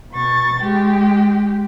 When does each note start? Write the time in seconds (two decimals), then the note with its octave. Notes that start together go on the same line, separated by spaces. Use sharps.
0.12 B2 C#6 A6
0.60 G#3 G4